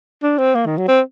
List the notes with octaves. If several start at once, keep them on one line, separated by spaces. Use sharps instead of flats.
D4
C4
A#3
D#3
F#3
C4